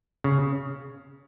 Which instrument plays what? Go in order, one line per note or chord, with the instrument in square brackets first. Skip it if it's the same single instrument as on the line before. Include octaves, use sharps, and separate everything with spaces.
[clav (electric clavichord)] C#3